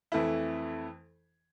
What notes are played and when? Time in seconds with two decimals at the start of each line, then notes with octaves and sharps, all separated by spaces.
0.12 F2 E3 A3 E4